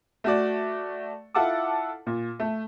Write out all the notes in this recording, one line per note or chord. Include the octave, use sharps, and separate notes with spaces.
A3 F#4 D5
E4 F4 A4 F#5 A5 D6
A#2
A3